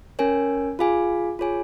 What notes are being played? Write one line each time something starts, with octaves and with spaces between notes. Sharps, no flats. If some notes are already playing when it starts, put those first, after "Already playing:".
C#4 A#4 C#5 G#5
F4 G#4 F5 G#5
F4 G#4 C#5 G#5